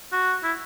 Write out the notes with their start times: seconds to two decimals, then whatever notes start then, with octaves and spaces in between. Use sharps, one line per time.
0.12 F#4
0.43 E4